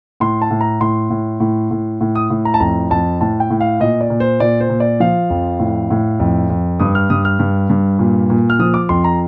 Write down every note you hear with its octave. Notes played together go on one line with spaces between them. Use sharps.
A2 C6
A5
A2
A#5
A2 C6
A2
A2
A2
A2
D#6
A2
A#5
A5
F2 A#5
F2 A5
A2 A5
G5
A2
F5
A#2 D#5
D5
A#2
C5
A#2 D5
C5
A#2
D5
F3 F5
F2
A2
A2
F2
F2
G2 D#6
F6
G2 D#6
F6
G2
G2
A#2
A#2
F6
F3 D#6
D6
F2 C6
A#5